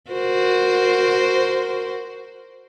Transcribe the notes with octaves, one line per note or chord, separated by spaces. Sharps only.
F#4 A#4 C5